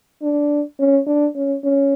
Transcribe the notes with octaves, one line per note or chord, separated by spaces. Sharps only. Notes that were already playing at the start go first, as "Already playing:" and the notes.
D4
C#4
D4
C#4
C#4